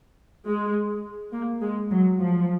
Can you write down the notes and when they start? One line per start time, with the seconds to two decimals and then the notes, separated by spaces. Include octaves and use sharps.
0.46 G#3
1.33 A#3
1.62 G#3
1.91 F#3
2.20 F3